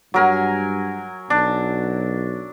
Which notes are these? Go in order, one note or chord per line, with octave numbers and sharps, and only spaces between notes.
G2 F#3 A#4 G#5
B1 D4